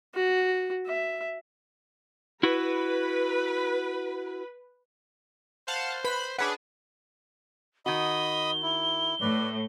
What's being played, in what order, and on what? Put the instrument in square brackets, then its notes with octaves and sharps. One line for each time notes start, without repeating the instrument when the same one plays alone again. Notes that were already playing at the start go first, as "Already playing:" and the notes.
[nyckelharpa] F#4
E5
[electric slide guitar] E4 F#4 [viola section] B4 B5
[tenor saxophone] C5 [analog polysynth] F5 F#5 A5
[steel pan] B4 [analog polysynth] B5
[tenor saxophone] C#4 [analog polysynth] D4 G#4 B4 [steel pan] F#5 B5
[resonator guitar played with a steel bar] D#3 F#4 [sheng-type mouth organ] D#5 B5 D#6 [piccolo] G7
[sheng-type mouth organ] E4
[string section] A2 [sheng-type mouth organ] B4 D5